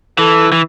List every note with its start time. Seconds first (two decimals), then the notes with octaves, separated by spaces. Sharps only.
0.18 E3 A4
0.52 E3